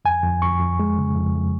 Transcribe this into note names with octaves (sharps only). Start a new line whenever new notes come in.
F2 G#5
F2
F2 C#6
F2
G#3
C#3
F2
F2